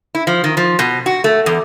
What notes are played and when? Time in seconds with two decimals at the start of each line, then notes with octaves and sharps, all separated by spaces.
0.15 E4
0.27 F3
0.44 D#3
0.57 F3
0.79 B2
1.06 F#4
1.24 A3
1.46 E2